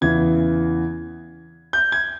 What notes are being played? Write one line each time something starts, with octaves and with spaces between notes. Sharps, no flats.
E2 C#3 E3 G#6
G6
G#6